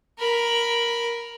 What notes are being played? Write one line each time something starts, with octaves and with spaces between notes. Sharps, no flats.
A#4 B5